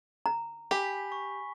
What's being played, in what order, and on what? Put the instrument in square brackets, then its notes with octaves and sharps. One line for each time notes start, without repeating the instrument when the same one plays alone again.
[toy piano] A#5
[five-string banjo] G4 [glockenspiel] G#5 B5 B6
[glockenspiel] C#6